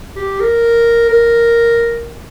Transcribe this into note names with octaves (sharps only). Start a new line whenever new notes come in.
G4
A#4
A#4